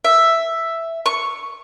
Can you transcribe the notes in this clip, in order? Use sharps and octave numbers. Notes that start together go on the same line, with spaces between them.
E5
C#6